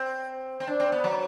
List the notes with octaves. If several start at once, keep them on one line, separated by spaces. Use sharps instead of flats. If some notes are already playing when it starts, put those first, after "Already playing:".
Already playing: C4
C4
D4
C4
B3
F#3